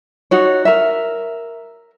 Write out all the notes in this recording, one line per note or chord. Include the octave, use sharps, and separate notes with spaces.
D#4 F#4 C#5
A#4 E5